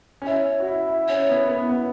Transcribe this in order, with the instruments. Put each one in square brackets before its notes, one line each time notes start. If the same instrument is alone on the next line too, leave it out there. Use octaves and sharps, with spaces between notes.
[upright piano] C#4
[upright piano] E4 [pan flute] C#5
[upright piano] F#4
E4
E4
[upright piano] C#4 [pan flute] C#5
[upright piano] B3
B3
B3